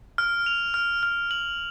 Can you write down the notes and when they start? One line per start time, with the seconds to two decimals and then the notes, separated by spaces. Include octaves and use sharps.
0.18 F6
0.46 F7
0.74 F6
1.03 F6
1.31 F#7